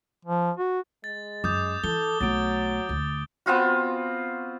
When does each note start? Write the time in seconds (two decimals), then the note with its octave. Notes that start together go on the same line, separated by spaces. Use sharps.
0.25 F3
0.57 F#4
1.04 G#3 A6
1.44 F#2 D6 D#6 G6
1.84 E3 A4 G7
2.21 B1 F#3 A3 A6 D7
2.89 D2
3.46 B3 C4 F4 F#4